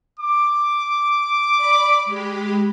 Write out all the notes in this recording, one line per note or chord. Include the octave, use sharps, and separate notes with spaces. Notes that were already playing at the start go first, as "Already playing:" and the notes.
D6
D5 B5
G#3 G4 B5